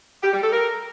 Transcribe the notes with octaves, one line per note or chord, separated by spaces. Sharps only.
G4
G3
A4
A#4